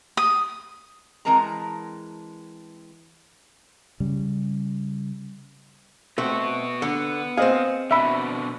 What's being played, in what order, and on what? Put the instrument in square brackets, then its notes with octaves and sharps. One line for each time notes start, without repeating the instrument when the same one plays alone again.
[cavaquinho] D#6
[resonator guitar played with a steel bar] E3 G#3 C4 A#4 A5 A#5
[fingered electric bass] C#3 G3
[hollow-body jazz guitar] A3 C4 [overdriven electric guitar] B3 F#4
[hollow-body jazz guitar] D3 [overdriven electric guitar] B3
[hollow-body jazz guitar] C4 G#4 [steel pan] C5 D#5 F5
[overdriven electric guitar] B2 D3 [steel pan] E5 B5